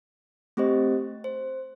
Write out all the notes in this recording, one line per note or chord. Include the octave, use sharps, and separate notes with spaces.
A3 C4 G4 C5 D#5
C5